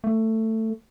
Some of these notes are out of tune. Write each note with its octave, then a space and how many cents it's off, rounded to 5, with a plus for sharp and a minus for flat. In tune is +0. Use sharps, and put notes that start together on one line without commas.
A3 +15